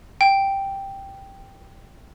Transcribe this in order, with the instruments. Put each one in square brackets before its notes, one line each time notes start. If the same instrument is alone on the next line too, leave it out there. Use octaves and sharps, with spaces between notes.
[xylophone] G5